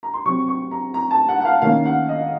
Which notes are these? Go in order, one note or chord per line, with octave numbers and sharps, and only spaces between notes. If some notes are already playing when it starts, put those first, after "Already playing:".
A#5
C6
C3 F#3 C4 C#6
C#6
A#5
A#5
A5
F#5
F#5
F5
D#3 A#3 C#4 F5
F#5
D#5